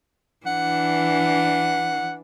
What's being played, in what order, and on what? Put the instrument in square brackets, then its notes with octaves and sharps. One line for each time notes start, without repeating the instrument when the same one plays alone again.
[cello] E3 D4 [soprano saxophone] F#5